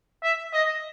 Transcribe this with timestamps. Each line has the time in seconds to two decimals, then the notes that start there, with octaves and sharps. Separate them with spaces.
0.23 E5
0.53 D#5